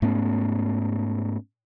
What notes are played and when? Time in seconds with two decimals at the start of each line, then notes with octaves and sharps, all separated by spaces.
0.02 G#2 A3 B3 C#4